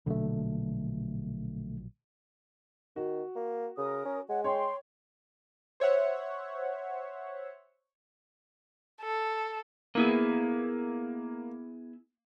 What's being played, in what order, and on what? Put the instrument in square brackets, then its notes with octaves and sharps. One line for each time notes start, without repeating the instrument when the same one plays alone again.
[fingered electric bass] A#1 B2 F#3 [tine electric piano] D3 A3
[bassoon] D#3 [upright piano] F#4
[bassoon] A#3
[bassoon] C#3 [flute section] A#4 D#6
[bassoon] C#4
[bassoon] G#3 [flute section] C#5 F#5
[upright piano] C#5 [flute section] G5 C6
[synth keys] C5 C#5 E5 F#5
[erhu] A4
[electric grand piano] A#3 [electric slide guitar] B3 E4 G#4